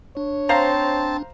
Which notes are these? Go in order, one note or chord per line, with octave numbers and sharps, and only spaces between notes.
D4 C#5
C4 C5 F5 A5 A#5